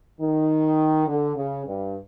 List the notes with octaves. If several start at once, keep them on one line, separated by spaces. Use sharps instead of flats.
D#3
D3
C#3
G2